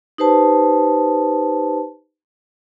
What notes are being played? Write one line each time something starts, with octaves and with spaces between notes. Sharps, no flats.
D#4 G4 B4 C5 A5